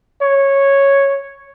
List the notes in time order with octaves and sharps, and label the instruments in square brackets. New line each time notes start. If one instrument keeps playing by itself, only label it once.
[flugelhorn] C#5